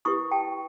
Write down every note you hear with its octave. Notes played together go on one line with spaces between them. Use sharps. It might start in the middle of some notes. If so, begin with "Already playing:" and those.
E4 G4 B4 C#6 D#6
G5 A5